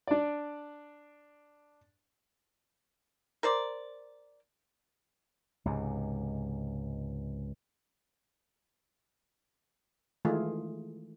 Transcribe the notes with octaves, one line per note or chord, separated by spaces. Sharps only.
D4 D5
A#4 C5 D5
C#2 G#2 C3
D#3 E3 G#3 A3 F4 G#4